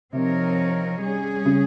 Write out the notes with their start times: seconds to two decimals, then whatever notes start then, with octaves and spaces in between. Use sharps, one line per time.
0.13 C3 F3 C4 D#4 A#4 C#5
1.01 G3 C#4 G#4
1.46 C#3